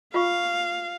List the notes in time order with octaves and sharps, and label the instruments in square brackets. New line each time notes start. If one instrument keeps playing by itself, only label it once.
[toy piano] F4 C#6 [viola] F5